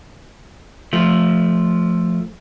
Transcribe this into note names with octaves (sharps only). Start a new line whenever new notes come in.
F3 A3